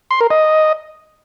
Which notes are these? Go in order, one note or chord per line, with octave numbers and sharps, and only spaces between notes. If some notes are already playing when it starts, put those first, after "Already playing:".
C6
A#4
D#5